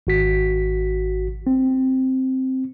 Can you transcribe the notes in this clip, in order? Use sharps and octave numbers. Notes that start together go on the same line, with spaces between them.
G#1 F#4 B6
C4